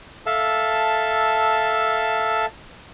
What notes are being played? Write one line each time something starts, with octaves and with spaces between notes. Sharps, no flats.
A4 E5 F5 A5